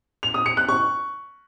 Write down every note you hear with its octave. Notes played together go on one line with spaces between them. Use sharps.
F7
D#6
C#7
F#6
C#6